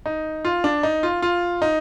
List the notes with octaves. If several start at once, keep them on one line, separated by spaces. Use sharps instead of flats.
D#4
F4
D4
D#4
F4
F4
D#4